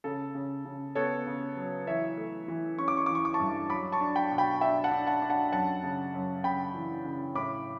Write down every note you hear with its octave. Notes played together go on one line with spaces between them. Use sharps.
C#3 A4
C#3
C#3
B3 A4 C#5
C#3
F#3
E3 C#5 E5
A3
E3
C#4 C#6
D6
C#6
E3 D6
C#6
D6
A5 C#6
G2
F#3 B5 D6
A5 C#6
D4
G5 B5
B2
G5 B5
D4 E5 G5
F#5 A5
D4
F#5 A5
D4
F#5 A5
F#2 F#5 A5
C#3
F#2
C#3 G5 B5
E3
C#3
A2 B5 D6